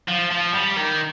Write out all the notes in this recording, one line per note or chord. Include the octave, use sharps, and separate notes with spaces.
F3
F3
G3
D#3